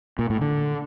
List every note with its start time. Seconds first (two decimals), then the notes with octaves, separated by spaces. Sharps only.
0.19 A#2
0.30 A2
0.41 D3